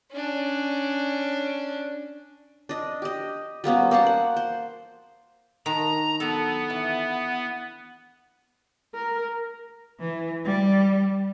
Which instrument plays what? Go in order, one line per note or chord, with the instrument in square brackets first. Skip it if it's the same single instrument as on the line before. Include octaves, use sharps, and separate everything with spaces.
[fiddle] C#4 D4
[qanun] D4 D#5
G4 D#5
G3 A#3 B3 C#4
A#3 C5 F#5 A5
F#5
C5
[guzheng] D#3 D4 [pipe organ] A#5
[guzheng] F#3 A4 [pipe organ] B3
[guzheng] E3
[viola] A#4
[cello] E3
G3